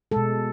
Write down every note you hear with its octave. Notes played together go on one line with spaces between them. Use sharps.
B2 G#3 A4